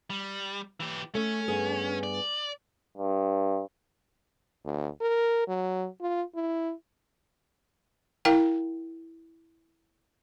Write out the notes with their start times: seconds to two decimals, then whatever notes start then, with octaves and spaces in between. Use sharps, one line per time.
0.10 G3
0.80 E3 G4
1.15 A3 C#4
1.48 G2 B3 G#4
2.03 D5
2.97 G2
4.65 D2
5.01 A#4
5.48 F#3
6.01 F4
6.35 E4
8.25 E4 A#4 F5 G5